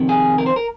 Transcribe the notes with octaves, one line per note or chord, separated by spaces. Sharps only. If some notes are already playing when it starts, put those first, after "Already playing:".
Already playing: F2 C3 D#3
G#4
A#4
C5
A#4